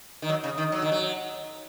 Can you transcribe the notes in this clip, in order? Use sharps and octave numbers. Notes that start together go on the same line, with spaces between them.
D#3
F#3
C#3
D#3
F#3
D#3
F#3